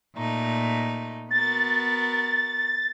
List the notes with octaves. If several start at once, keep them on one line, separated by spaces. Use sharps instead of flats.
A#2 A3 D#4
B3 F#4 A#4 A6